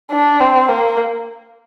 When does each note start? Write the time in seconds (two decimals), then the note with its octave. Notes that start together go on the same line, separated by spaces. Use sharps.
0.12 D4
0.41 C4
0.69 A#3